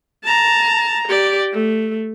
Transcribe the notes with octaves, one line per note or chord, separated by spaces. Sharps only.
A5 A#5
G4 D5
A3